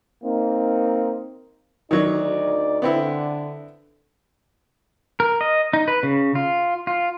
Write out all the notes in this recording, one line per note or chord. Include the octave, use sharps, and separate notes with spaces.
A#3 C4 D#4
D2 D#3 F#3 D#4 D5
D3 B3 C4 E4
A#4
D#5
D#4
B4
C#3
F4
F4